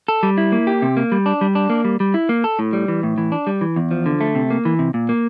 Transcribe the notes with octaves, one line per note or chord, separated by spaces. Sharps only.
A4
G3
E4
A#3
G4
C3
A#3
G3
D4
G3
D4
A#3
G3
G3
E4
A#3
A4
A2
G3
E3
A2
E3
D4
G3
E3
E2
F3
D3
A3
C3
A#3
E3
C3
A#2
A#3